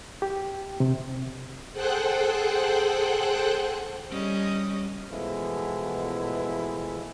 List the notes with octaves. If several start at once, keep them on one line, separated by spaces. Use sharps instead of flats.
G4
C3
G#4 A4 C5 F#5 G5 F#6
G3 C#4 D#5
B2 E3 F3 G#3 A3 E4